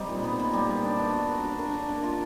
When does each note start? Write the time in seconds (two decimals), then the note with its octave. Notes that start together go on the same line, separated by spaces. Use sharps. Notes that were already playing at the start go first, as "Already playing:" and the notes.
Already playing: G3 C4 D#4
0.09 A#2
0.24 B3
0.40 A#2
0.53 G3
0.69 A#4
0.84 D4
0.99 B3
1.13 F#4
1.28 A#4
1.44 D4
1.59 A#4
1.74 D4
1.89 A#3
2.03 F4